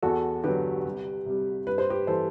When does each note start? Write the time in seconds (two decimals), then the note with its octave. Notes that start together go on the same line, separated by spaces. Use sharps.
0.02 E2 F#4 A4
0.44 D3 F#3 G4 B4
0.85 C2
1.26 C3 G3
1.67 G2 B4
1.78 C5
1.90 G4 B4
2.07 E3 G3 A4 C5